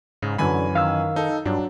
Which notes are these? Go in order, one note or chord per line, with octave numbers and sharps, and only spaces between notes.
G#2 C#3
F#2 D3 E3 G#5 B5
D#3 F5 E6
D#4 A4
G2 F#3 D4